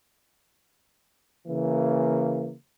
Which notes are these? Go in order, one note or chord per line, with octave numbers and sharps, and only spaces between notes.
C#3 E3 A#3